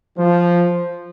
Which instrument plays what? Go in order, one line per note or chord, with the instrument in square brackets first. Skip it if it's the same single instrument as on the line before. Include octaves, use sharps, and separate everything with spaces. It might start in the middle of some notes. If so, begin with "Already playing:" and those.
[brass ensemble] F3